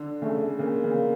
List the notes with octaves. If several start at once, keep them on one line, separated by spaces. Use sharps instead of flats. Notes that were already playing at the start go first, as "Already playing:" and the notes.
Already playing: D3
C#3 A3
C#3 A#3
C#3